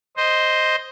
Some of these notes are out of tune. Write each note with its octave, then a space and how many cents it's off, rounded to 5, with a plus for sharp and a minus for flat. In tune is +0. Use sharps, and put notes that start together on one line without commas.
C5 +0 D#5 +0